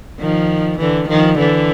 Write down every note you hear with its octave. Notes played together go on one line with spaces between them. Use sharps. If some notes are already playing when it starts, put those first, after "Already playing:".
D#3 F3
D3 E3
D#3 F3
D3 E3